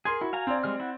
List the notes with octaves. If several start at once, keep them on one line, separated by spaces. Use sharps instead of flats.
G#4 A#4 C6 G#6
E4 F#4
F5 G#5 A#5
C4 D5
G3 G#3 F6
E4 F#5